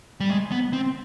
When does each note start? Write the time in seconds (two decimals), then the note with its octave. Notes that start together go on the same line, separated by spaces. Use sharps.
0.20 G3
0.30 G#3
0.52 B3
0.73 C4